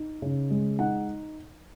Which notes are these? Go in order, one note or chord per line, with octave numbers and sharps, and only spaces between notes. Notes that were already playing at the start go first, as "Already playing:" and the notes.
Already playing: D#4
C#3
G#3
D#4 F#5